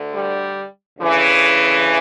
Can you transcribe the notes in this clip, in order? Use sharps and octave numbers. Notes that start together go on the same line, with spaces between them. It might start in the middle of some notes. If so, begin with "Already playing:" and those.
Already playing: D2 D3
G3
D2 C#3 E3